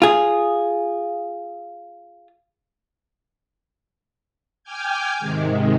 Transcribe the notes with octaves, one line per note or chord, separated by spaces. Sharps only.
F4 G#4
G5 G#5 D6 F6 G6 G#6
G#2 C3 D#3 G#3